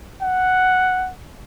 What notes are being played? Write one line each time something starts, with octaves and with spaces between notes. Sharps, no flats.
F#5